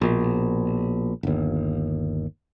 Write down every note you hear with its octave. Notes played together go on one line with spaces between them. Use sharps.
A#1 B2
G1 D#2